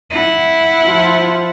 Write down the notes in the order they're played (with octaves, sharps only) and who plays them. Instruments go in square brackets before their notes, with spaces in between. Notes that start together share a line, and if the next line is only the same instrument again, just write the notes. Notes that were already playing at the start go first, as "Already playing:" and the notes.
[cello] E4 F#5
[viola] F3 F4